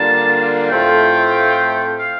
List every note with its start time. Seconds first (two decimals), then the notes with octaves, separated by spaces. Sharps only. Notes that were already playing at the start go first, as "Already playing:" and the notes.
Already playing: D3 G3 A#3 D4 F4 A5
0.70 A2 A3 C4 F4 A4 G5
1.99 F5